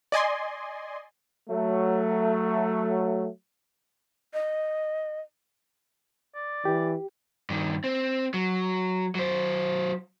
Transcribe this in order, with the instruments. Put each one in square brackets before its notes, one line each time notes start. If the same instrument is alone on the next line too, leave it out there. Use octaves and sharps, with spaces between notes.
[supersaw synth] D5 D#5 G#5 C6
[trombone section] F#3 A3
[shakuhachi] D#5
[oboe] D5
[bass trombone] E3 [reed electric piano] G4
[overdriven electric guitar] G2 D#3
C4
F#3
F#3 C5